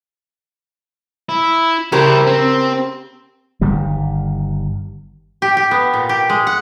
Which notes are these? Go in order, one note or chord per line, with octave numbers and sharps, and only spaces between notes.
E4
C#3 E4 G4 A#4 C5
C4
G1 D#3 G3
G4
G4
B3
A#2
G4
G#3
F#5